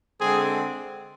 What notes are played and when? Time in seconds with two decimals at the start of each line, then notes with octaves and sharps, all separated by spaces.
0.20 D3 G#3 C4 G#4